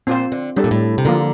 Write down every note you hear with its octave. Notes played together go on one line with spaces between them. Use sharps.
A#2 C4 F4 C5
D3
A2 G3 D4 A4
A#2
A2
C3
D3 F3 A#3 F4 A#4